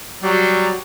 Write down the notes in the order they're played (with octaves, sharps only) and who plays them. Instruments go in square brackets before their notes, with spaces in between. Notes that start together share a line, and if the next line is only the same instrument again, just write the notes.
[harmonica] F#3 G3